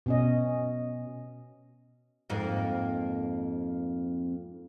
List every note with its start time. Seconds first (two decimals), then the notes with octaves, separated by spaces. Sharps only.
0.06 B2 C#4 D#5
2.30 F2 G#2 A#3